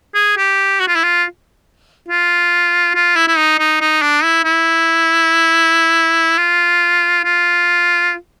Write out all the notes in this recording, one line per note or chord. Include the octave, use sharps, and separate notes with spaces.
G#4
G4
F#4
F4
E4
F4
F4
F4
E4
E4
D#4
D#4
D#4
D4
E4
E4
F4
F4